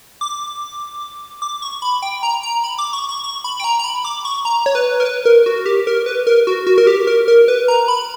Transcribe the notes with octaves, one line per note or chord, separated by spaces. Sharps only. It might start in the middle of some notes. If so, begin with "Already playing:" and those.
D6
D6
C#6
B5
G5
A#5
A#5
B5
D6
C#6
C#6
C#6
B5
G5
A#5
A#5
B5
D6
C#6
A#5
C#5
B4
A#4
B4
A#4
F#4
G4
A#4
B4
A#4
F#4
F#4
A#4
G4
A#4
A#4
B4
A#5
B5